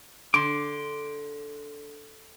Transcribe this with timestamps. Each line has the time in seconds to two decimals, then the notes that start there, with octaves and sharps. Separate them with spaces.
0.34 D3 C6 D6